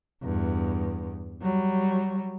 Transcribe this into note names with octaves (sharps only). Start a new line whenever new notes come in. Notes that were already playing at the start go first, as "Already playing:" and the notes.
E2 G2
F#3 G3